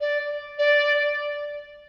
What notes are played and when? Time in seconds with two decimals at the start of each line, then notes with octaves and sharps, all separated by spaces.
0.01 D5
0.59 D5